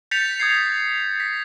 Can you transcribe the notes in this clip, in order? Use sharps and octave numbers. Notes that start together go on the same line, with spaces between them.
G6 A6 B6 C#7 F7
D#6 G#6 C7
B6